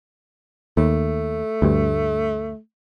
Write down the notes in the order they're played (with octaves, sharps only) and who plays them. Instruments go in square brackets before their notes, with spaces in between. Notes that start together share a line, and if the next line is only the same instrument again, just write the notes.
[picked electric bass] D#2 [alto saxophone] A3
[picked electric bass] D2 G2